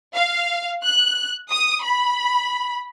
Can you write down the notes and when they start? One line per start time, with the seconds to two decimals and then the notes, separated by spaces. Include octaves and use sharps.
0.15 F5
0.83 F#6
1.50 D#6
1.83 B5